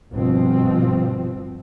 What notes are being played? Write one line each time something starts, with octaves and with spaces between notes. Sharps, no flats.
G1 B2 F3 C4